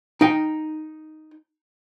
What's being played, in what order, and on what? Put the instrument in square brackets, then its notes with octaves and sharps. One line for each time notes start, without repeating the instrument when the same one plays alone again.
[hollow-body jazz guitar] D#4 G5